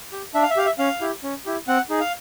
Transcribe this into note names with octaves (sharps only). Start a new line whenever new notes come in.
G4
D4 E5
F5
E5
G4 F5
E5
C#4 F5
E4 G4
C#4
E4 G4
C4 F#5
D#4 G#4
F5